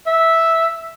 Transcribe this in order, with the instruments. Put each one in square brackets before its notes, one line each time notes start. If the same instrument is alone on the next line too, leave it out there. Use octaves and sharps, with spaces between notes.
[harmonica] E5